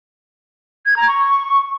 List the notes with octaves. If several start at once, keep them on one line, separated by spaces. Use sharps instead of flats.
G#6
A#5
C#6